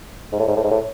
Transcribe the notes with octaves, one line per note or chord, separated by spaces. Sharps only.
G#2
A2
G#2
A2
G#2
A2